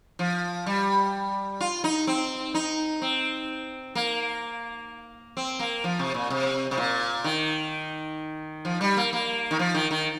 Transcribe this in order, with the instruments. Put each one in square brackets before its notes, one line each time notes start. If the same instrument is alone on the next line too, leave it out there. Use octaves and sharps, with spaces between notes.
[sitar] F3
G3
F4
D#4
C4
D#4
C4
A#3
C4
A#3
F3
C3
A#2
C3
C3
A#2
D#3
F3
G3
A#3
A#3
D#3
F3
D#3
D#3